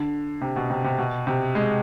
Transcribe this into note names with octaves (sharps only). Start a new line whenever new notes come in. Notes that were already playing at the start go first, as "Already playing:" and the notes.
Already playing: D3
C3
B2
C3
C3
B2
C3
G#3